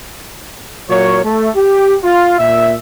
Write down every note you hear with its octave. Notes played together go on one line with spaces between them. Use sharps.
A#2 F#3 A#3 C#5
A3
G4
F4
A#2 E5